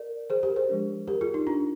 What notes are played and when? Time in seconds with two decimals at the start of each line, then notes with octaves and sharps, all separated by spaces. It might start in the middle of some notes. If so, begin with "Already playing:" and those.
Already playing: A#4 D5
0.30 G#4 C5
0.43 G4 A#4
0.56 G#4 C5
0.69 F3 G#3 D4
1.08 G4 A#4
1.21 F4 G#4
1.34 D#4
1.47 D4 F4